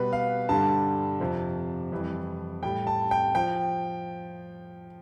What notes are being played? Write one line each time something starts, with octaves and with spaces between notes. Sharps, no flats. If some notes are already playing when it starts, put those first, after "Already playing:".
Already playing: B2 G3 B4
F5
G2 D3 G3 A5
F2 C3 F3
F2 E3 G3
A2 G3 G5
A5
G5
F3 G5